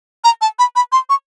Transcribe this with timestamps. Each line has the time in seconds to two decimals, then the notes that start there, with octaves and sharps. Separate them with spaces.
0.24 A#5
0.41 A5
0.59 B5
0.76 B5
0.92 C6
1.10 C#6